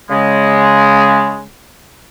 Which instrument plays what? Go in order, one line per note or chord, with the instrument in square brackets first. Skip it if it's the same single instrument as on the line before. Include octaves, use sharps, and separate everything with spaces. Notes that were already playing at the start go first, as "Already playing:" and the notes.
[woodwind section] C#3 G#3